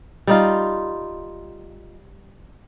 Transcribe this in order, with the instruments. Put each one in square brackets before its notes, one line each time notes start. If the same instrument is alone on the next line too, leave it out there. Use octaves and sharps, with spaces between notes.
[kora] G3 D#4 F4